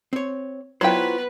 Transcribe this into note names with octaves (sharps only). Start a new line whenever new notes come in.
C4 C#5
F#3 B3 E4 F4 B4 C5 G5